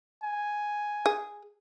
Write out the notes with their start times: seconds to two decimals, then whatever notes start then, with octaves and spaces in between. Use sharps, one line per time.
0.23 G#5
1.06 G#4